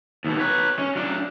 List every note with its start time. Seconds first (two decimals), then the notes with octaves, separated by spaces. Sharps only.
0.25 D#2 B2
0.40 B4 C#5
0.79 C#4
0.95 F#3 D4